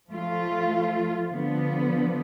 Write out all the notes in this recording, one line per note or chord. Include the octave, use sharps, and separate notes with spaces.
F3 A3 F4
D3 F3 B3